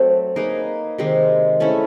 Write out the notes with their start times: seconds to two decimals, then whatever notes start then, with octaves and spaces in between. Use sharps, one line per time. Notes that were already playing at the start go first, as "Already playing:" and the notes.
Already playing: F#3 A3 C4
0.36 A#3 D#4 G#4 B4
0.98 C3 D#3 G#3
1.60 A3 C#4 E4